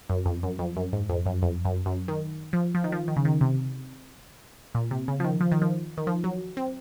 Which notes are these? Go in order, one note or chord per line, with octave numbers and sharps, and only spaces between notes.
F#2
F2
F#2
F2
F#2
G#2
F2
F#2
F2
F#2
F#2
D#3
F3
F3
D#3
F3
D#3
C#3
D#3
C3
A#2
C3
C#3
F3
D#3
F3
D#3
F3
D#3
F3
F#3
C4